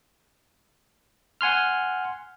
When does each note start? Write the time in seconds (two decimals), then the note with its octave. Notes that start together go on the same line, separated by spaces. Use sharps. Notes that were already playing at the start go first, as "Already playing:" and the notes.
1.41 F#5 G#5 C6 F6